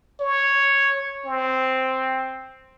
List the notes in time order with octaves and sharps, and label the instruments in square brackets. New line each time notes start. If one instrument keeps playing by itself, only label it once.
[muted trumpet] C#5
C4